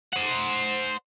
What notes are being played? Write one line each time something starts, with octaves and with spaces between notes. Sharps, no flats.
C5 F#5